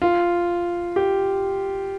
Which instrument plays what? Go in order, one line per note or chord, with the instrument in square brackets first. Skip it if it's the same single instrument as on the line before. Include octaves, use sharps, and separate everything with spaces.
[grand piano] F4
G4